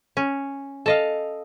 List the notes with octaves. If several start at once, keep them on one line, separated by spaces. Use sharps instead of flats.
C#4
A4 D#5 F5